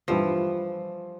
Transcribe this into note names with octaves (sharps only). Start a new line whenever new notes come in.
G2 E3 F3 G3